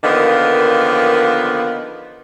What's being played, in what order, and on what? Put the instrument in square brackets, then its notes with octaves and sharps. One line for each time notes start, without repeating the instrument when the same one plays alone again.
[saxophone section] D3 D#3 F3 A#3 B3